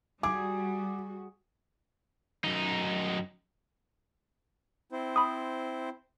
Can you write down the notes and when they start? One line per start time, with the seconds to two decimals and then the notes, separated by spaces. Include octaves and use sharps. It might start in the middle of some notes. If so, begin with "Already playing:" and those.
0.23 G3 F#4 G#4 D6
2.45 F#2 D#4
4.92 C4 E4 C5
5.16 B5 D#6